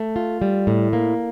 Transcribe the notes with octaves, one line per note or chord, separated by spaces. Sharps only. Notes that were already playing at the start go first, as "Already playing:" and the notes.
Already playing: A3
F4
G3
A2
A#3